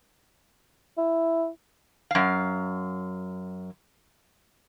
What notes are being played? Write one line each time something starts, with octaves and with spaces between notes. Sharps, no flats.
E4
F#2 F5